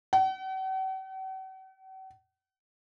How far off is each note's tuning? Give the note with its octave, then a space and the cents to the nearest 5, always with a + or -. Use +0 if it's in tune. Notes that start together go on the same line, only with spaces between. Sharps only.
F#5 +45